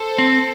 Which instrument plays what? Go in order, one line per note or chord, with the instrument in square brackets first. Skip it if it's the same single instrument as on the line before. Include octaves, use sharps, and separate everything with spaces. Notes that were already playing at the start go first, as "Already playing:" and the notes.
Already playing: [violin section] A4 C5
[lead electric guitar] C4